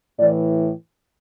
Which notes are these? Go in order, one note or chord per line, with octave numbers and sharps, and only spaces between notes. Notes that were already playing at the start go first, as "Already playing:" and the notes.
A2 E3 D5